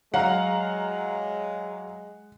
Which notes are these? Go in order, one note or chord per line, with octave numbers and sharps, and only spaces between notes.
F#3 G#3 F5 F#5 A#5